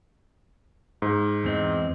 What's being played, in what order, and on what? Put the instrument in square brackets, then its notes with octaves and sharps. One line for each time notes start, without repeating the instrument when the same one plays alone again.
[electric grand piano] G#2
[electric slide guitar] E2 C4 D#5